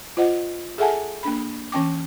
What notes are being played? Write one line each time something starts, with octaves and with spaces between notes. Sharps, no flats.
F4 C5 D#5 F#5
G#4 A4 E5 F#5 G#5 A5
A#3 D4 B5
E3 C#4 G5 D6